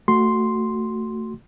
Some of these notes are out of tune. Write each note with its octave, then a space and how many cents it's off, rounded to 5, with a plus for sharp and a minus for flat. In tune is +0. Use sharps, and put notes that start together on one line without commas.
A3 +20 F#4 +0 C6 +0